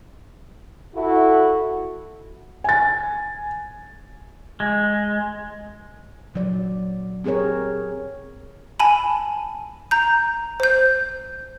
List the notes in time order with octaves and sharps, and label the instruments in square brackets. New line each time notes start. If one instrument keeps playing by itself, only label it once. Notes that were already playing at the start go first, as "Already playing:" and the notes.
[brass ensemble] E4 F#4 A4
[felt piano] G#5 A6
[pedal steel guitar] G#3
[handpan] A#2 F#3 D5
C4 G4 G#4 A#4 C#5
[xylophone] G#5 A5 B5
A#5 G6
C5 G6